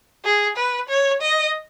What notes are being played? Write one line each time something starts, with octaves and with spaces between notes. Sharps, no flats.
G#4
B4
C#5
D#5